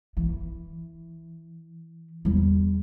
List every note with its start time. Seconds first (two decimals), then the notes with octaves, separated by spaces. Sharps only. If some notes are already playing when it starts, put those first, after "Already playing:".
0.17 E3
2.25 E2 G3